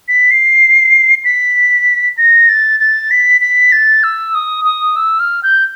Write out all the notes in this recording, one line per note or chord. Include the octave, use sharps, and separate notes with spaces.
B6
C7
B6
A#6
A6
A6
B6
B6
A6
E6
D#6
D#6
E6
F6
G6